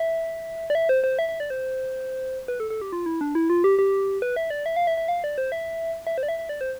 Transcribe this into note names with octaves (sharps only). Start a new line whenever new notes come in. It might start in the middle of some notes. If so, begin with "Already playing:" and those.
Already playing: E5
D5
E5
C5
C5
E5
E5
D5
C5
B4
A4
A4
G4
F4
E4
D4
E4
F4
G4
G4
B4
E5
D5
E5
F5
E5
E5
F5
D5
C5
E5
E5
C5
D5
E5
E5
D5
C5